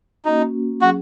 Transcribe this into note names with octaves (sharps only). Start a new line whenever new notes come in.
A#3 C#4 D#4 F#4
F#3 C#4 F#4 G#4 F#5